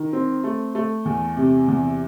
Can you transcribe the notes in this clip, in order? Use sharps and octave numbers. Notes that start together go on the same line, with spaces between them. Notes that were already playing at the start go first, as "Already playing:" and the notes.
Already playing: D#3
C4
A3
A3
E2
C3
E2